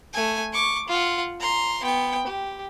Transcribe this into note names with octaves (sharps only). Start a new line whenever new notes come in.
A3 G#5
C#6 D6
F4 F#5
A#5 C6
B3 G5
G4